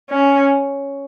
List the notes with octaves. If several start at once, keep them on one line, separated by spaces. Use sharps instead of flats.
C#4